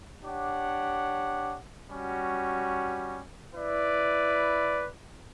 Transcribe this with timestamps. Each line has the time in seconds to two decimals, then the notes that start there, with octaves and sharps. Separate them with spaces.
0.23 D4 G4 C#5 F#5
1.89 G3 C#4 F#4
3.55 E4 B4 D5